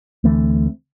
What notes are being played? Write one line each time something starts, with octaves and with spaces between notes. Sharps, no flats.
D2 E3 A3 C4